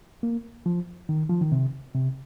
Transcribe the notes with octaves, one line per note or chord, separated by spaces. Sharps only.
A#3
F3
D#3
F3
D#3
C3
C3